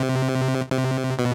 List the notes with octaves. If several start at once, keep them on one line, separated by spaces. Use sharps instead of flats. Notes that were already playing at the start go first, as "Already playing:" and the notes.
Already playing: C3
C3
B2